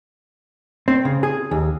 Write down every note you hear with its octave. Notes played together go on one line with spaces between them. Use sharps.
C4
C#3
G#4
D#2